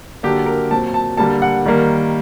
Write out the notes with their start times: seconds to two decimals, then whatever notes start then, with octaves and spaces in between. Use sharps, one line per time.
0.23 D3 F#3 A#3 G4
0.46 A#4
0.71 A#2 F#3 C4 A5
0.94 A5
1.17 D3 G3 A#3 A5
1.42 F#5
1.66 D#3 G3 A#3